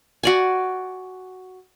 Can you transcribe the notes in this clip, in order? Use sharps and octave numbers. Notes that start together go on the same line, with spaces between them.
F#4 D5 G#5